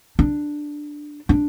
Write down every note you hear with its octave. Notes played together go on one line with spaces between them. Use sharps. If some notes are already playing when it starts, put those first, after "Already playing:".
D4
D4